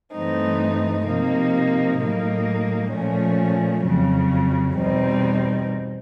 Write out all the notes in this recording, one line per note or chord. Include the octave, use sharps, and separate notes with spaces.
G2 E3 A3 C4 D#4
C3 F3 A#3 D#4
A2 F#3 A#3 D#4
A#2 F3 A3 C#4
F2 C#3 F#3
E2 B2 G3 C4 D#4